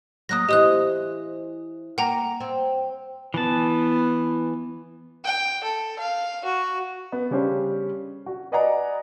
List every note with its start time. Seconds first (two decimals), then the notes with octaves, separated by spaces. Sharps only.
0.29 F#3 A#3 D#6 F#6 A#6
0.49 E3 G4 C5 D#5 D#6 F#6
1.98 A#3 F#5 G5 A#5
2.40 C4
3.34 E3 B3 A5
5.25 G5
5.64 A4
5.99 F5
6.45 F#4
7.12 B3
7.31 C#3 G3 C#4 D4 G4 C5
8.26 F#4
8.52 B4 D5 D#5 F#5 G#5 A#5